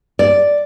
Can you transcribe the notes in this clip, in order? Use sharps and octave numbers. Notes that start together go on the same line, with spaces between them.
D5